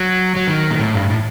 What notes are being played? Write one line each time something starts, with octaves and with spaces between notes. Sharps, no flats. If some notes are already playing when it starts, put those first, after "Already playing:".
Already playing: F#3
F#3
D#3
A#2
A2
G2
A2